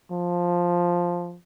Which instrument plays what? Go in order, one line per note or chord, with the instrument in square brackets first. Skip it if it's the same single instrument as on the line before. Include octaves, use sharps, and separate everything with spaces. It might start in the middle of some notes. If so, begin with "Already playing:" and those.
[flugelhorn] F3